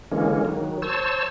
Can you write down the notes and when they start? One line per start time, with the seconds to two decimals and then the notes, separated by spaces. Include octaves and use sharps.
0.11 D3 E3 G#3 A#3 C#4
0.45 D#3 F#3
0.82 C5 C#5 A5 E6